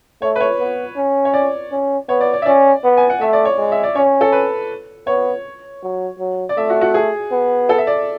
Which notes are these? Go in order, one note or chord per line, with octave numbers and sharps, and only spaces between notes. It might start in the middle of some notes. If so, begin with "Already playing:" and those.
A3 C#5
B4
C#5
B3
C#4
C#5
D5
C#4
B3 C#5
D5
D5
E5
C#4 D5
B3
G#5
F#5
A3 E5
D5
C#5
G#3
E5
D5
C#4 C#5
A4
B4
B3 C#5
F#3
F#3
D5
A3 E5
F#4
F#4
G#4
B3
A4
E5
D5